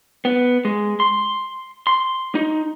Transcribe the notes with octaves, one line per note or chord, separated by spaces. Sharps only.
B3
G#3
C6
C6
D#4